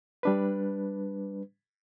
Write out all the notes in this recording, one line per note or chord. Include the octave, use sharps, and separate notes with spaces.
G3 D4 B4